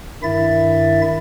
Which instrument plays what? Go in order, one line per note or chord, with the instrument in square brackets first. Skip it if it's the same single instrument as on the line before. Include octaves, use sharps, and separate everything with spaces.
[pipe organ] G2 D#3 E4 E5 A6